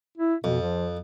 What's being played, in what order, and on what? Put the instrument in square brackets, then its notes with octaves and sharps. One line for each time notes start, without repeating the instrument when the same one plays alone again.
[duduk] E4
[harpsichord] F2 [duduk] B2
[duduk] F3